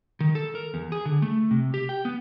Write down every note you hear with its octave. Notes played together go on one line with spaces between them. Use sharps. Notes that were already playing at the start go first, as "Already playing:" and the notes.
D#3
A4
A#4
E2
G#4
D3
A3
C3
G4
G5
B3